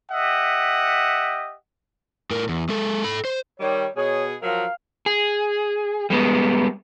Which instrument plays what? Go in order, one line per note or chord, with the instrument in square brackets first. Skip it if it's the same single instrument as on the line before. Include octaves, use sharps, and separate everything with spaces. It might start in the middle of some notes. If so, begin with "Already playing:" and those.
[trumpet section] G4 D#5 E5 F#5
[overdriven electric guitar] A2 A#4
E2
G#3 A4
A4 B5
C5
[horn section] D#3 G3 [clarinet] C#5
[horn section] B2 G#4 [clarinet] C#5
[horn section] F3 F#3 A#4 [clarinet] F5
[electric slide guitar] G#4
G3 G#3 B3